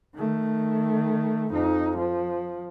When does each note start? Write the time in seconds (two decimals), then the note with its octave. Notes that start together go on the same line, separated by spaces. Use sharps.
0.15 D#3 A3
1.52 F2 D#4
1.98 F3